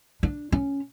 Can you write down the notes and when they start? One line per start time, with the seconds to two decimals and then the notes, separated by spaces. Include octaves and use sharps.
0.23 D4
0.52 C#4